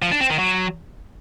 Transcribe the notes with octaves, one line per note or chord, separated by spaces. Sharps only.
F3
D4
C4
D#3
F#3